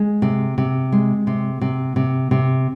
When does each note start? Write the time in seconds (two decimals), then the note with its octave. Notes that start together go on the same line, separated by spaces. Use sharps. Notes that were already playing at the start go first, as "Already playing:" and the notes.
Already playing: G#3
0.22 C3
0.58 C3
0.92 G#3
1.27 C3
1.61 C3
1.96 C3
2.31 C3